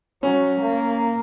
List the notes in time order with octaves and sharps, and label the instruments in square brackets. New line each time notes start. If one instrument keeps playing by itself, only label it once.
[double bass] F#3 [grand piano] C#4
[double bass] A#3